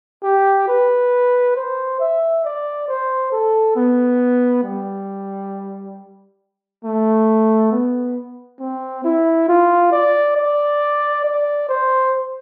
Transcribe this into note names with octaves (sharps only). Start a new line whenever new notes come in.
G4
B4
C5
E5
D5
C5
A4
B3
G3
A3
B3
C4
E4
F4
D5
D5
D5
C5